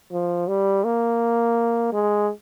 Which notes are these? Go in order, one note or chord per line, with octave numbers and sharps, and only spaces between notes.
F3
G3
A#3
G#3